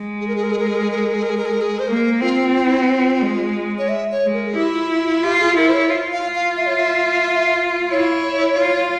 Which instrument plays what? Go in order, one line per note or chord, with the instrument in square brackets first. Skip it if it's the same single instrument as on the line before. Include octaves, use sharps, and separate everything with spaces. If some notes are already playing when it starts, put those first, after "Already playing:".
Already playing: [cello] G#3
[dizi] G#4
A#4
G#4
A#4
G#4
A#4
G#4
A#4
G#4
A#4
G#4
A#4
G#4
A#4
G#4
A#4
G#4
A#4
G#4
C5
[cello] A#3 [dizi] A#4
[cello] C4 [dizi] F4
[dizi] F4
E4
F4
[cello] G#3
[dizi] C#5
E5
C#5
[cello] G#3
[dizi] A#4
G#4
[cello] E4 [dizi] G4
[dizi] F4
F4
F4
[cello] F4 [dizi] G4
[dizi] G#4
[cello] E4 [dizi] A#4
[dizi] C5
C#5
[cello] F4
[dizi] F5
[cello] F4
[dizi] F5
E5
C#5
E5
[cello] E4 [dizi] C#5
[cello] F4